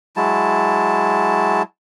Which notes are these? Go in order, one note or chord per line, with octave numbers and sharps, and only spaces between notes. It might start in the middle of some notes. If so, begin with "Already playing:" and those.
F#3 G#3 E4 A5